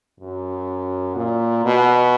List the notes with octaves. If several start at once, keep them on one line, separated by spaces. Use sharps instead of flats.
F#2
A#2
B2